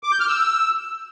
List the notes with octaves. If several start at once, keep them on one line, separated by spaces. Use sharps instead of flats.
D6
G6
F6
E6